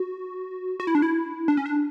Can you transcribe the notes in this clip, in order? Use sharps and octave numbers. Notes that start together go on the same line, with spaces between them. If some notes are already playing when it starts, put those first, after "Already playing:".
Already playing: F#4
F#4
E4
D4
E4
D4
C#4
D4